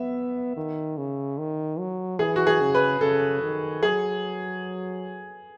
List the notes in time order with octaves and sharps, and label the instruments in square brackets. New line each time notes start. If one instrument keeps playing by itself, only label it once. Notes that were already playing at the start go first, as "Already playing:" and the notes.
Already playing: [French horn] B3 [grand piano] E5
[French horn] D#3
C#3
D#3
F#3
[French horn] E3 [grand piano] G#4
[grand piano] F#4
G#4
[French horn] C#3
[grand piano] B4
[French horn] C#3 [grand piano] A4
[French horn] D#3
[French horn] F#3 [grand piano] G#4